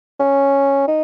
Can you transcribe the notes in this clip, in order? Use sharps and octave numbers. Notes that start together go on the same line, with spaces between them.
C#4
D#4